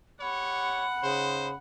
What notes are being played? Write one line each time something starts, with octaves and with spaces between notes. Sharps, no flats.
G4 C#5 F#5 B5
C#3 D#4 C5